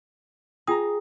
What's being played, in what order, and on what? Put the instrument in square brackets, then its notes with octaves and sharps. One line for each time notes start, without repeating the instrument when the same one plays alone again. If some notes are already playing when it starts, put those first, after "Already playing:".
[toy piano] F4 G5 D#6 [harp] G#4 A#5